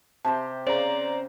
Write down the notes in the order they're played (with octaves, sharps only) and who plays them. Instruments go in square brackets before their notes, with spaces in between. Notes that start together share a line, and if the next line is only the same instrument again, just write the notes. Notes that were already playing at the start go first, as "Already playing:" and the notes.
[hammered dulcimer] C3 G4 C5 [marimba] A5
[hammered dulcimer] C#3 [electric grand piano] C5 A#5 [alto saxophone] D5